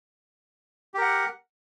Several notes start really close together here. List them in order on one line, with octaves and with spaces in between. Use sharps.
G4 A#4 F#5